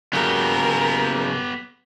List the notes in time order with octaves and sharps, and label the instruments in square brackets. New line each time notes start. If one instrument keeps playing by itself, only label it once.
[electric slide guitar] C#3 F#3 [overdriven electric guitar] B3 G4 [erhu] A#4